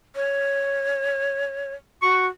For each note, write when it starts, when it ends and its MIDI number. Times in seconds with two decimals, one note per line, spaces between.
0.16 1.74 73
2.02 2.28 66
2.02 2.26 85